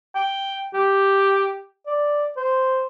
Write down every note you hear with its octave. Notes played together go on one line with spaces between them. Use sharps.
G5
G4
D5
C5